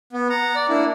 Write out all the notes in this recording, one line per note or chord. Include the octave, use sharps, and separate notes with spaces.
B3
F#5 A#5
D5
A#3 D4 E4